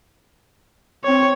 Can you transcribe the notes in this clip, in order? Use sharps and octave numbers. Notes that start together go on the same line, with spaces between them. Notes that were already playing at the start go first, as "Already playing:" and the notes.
C4 C#5